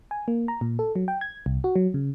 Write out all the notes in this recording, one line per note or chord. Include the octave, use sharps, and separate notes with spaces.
G#5
A#3
A#5
A#2
A4
F#3
G5
G#6
C2
F#4
F#3
C#3